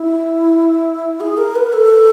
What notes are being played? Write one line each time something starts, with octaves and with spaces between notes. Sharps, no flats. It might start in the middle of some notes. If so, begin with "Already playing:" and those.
Already playing: E4
G#4
A#4
B4
A4